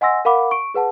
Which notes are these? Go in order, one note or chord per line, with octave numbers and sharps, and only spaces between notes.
D#5 F#5 G#5 C6 E6 A#6
A#4 F5 F#5 B5 D6
C#6 D7
G#4 B4 F#5 A5